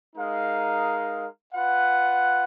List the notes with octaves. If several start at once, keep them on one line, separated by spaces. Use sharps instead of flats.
G#3 D#4 A#4 F5
F4 B4 F#5